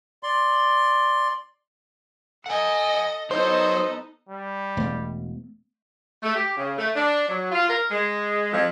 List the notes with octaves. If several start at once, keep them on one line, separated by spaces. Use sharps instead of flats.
D5 C6
A4 D#5 F#5 G#5
F#3 B3 D#4 A4 C5 C#5 D#5
G3
E1 A3 B3
A3
G4
C#3
A3
D4
F#3
F4
A#4
G#3
F2